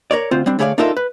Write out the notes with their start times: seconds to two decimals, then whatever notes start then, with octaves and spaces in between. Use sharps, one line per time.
0.11 A#4 C#5 D5
0.31 D2 C4 F4 C5
0.46 G3 C4 D4
0.59 D2 A3 G#4 C#5 D5 F5
0.78 D4 D#4 F4 A4 A#4 E5
0.97 B4